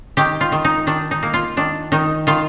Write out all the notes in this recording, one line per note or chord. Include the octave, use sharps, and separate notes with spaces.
D#3 G4
F4
D#3
D#4
D#3 D4
D#4
A#3
F4
D#3 D4
D#3 D#4
D#3 F4